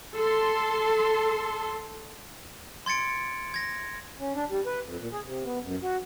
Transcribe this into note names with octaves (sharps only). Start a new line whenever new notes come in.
A4 C6
C6 G#6 A6 C#7 D7
G#6 A#6
C#4
D4
G3
B4
F2
A#2
G#4
C3
B3
F#2
F#4